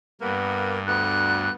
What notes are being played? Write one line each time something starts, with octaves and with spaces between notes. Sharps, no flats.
G2 A#3 B3
D2 B3 F#6